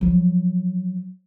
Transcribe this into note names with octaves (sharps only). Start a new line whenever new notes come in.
F3 F#3